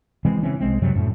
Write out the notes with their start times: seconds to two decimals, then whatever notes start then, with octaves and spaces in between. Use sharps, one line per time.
0.25 C#3 E3 G#3 C4
0.43 E3 C4 C#4
0.61 C2 G#3 C4
0.82 F#2 C3 F#3 G3
0.95 F#2 A2